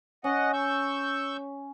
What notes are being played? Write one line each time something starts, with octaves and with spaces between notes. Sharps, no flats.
C#4 D#5 F#5
C#6 E6 G6